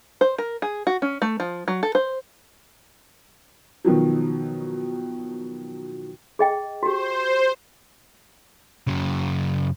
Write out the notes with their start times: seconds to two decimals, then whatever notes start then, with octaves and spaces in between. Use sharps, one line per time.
0.21 C5
0.38 A#4
0.62 G#4
0.87 F#4
1.02 C#4
1.22 A3
1.40 F3
1.68 F#3
1.83 A4
1.95 C5
3.85 B2 D#3 F3 F#3
6.39 G#4 D#5 G5
6.83 F#4 G4 C5
8.87 F#2 C#3